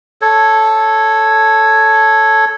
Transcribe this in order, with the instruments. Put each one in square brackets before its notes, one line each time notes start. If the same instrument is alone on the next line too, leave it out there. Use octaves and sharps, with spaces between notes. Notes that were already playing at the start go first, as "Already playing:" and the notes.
[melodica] A4 C#5